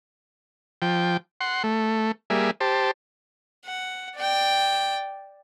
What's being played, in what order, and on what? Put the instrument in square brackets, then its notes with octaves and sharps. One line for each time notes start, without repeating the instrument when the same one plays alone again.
[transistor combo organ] F3 G5
F#5 C6
A3
G3 A#3 G#4 E5
G4 C5 A5
[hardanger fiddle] F#5
D5 G5